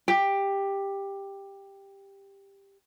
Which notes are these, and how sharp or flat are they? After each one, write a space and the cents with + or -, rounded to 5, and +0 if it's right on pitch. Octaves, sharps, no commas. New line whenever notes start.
G4 +10